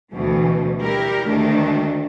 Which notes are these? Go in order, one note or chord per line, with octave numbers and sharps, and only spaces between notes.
D2 B2 E3 A3
G3 E4 G4 A#4
D2 D#3 A3 D4